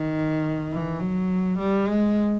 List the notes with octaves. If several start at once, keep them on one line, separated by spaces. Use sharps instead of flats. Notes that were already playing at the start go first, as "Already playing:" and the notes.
Already playing: D#3
E3
F#3
G3
G#3